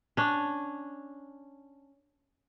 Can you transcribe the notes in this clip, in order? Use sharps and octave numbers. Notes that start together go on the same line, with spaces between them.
C#4 D4